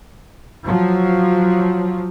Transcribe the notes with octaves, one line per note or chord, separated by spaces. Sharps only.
F3 F#3